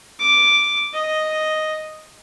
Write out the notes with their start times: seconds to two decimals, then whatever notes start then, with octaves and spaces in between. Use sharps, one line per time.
0.20 D6
0.93 D#5